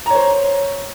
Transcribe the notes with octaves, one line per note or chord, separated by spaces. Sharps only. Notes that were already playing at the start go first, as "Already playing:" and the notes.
C5 C#5 A#5